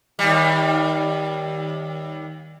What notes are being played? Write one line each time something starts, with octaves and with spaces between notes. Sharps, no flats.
D#2 G3